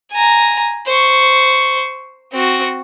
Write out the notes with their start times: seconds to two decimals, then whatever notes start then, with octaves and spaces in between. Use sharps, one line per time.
0.12 G#5 A#5
0.86 C5 C#6
2.32 C4 F#4